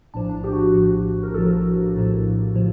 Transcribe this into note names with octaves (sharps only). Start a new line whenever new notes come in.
A#1 A2 F3 D4
D4
G4
F#4
G4
A#1 A2 F3
A#4
A#1 A2 F3 A4
A#1 A2 F3
A2 F3